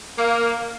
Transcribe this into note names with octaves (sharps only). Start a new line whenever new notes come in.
A#3